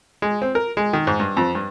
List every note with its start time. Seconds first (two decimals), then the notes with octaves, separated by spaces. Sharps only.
0.22 G#3
0.42 C4
0.55 A#4
0.77 G#3
0.93 D#3
1.07 G#2
1.20 G2
1.37 F2
1.55 G2